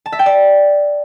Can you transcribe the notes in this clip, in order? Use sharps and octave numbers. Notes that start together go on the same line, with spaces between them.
A5
E5
G5
D5